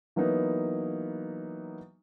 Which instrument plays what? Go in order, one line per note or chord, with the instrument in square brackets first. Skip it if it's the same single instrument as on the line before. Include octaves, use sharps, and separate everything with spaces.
[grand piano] E3 F#3 A#3 B3 D#4 B4